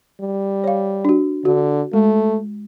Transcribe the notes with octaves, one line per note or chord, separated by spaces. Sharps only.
G3
C#5 F5
D4 F#4
D3 F#4
G#3 A3